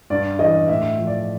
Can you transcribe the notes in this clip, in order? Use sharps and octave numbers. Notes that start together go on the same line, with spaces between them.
G2 D5
E3 D#5
A2 E5
F3
D5